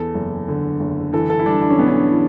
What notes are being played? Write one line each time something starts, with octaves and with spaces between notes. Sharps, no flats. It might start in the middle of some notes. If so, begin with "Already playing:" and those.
Already playing: E2 A4
F#1
D3
F#1
E3 A4
A4
E4
G3 D4
D4
C#4
B1 B3
C#4
E3